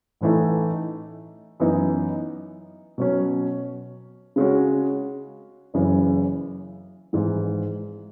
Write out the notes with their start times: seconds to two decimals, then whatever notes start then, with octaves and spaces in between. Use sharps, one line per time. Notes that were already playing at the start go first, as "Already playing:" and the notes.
0.21 A1 A2 E3 A3 D#4
1.60 F#2 E3 B3 D#4
2.98 B2 F#3 C#4
4.36 C#3 G#3 C#4 F#4
5.74 F#1 F#2 C#3 E3
7.13 G#1 G#2 E3